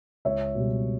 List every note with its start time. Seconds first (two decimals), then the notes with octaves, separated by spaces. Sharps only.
0.25 C#2 C#5 E5
0.55 B2 G3